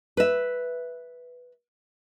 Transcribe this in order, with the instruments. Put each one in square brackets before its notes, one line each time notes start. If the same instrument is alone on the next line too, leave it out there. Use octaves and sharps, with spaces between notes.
[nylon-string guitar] B4 E5